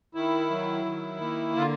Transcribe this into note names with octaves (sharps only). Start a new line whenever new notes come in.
D#3 E4
F#3
D#3
A#3
D3 F4